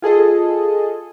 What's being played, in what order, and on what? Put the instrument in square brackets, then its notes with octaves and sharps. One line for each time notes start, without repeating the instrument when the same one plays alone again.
[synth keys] F4 G#4 A4 D#5